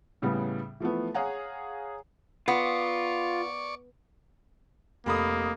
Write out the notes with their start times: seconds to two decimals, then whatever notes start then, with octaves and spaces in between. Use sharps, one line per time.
0.22 A2 C#3 G3 B3
0.80 E3 F3 A3 B3
1.14 G#4 C#5 F5 F#5 G#5 A#5
2.48 B3 F4 D5 C#6
5.06 F1 A#3 B5 D#6